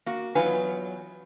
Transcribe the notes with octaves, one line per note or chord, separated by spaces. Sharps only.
A#3 F#4
E2 F#3 D#4 F4 B4 G#5